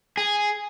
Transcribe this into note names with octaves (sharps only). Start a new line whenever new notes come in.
G#4